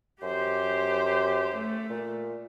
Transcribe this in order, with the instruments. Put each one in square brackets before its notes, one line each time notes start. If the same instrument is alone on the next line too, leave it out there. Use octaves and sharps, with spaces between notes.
[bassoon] F#2 [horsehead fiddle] G4 C5
[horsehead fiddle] A3
[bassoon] A#2